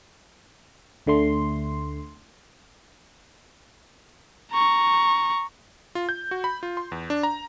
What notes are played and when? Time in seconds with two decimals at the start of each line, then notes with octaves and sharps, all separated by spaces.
1.06 D2 D3 A3 C6
4.52 A#5 C#6
5.95 F4
6.09 G6
6.31 F#4
6.44 B5
6.63 F4
6.77 C6
6.92 E2
7.10 D4
7.23 A#5